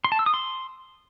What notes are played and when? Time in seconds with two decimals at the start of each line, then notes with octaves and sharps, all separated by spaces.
0.04 C6
0.12 A5
0.19 E6
0.26 D#6
0.34 C6